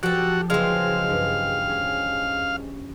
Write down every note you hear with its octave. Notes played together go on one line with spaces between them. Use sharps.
F3 F#4 G4 A4
F#1 E2 G#3 C4 F5
G2
C#4